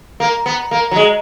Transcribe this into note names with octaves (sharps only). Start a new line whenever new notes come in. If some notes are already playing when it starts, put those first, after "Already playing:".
A#3
B3
A#3
F#3
G#3